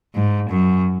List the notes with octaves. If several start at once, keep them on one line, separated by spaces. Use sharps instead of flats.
G#2
F#2